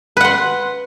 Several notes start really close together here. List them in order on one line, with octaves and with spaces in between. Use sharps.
B4 F#5 C6